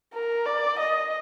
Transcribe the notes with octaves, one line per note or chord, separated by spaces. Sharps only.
A#4
D5
D#5